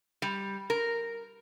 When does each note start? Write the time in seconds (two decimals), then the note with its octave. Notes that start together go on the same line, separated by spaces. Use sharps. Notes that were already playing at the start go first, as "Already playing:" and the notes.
0.22 G3
0.70 A#4